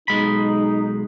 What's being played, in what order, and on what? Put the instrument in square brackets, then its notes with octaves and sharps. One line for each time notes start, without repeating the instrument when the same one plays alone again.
[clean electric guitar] B1 G#3 B5 [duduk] D#4